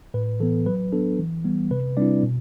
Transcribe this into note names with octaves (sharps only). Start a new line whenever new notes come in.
A2 B4
E3 B3 A4
F#3 B4
B3 D4 A4
E3
G3 B3
C3 B4
G3 C4 D4 E4 D5
B2